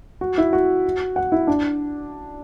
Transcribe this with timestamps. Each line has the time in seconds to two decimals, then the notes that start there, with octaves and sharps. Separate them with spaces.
0.21 F#4
0.38 E4
0.53 F#4
1.16 F#5
1.32 E4
1.47 D4